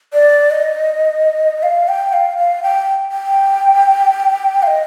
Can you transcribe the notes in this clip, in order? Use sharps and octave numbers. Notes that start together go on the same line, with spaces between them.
D5
D#5
F5
G5
F5
F5
G5
G5
F5
D#5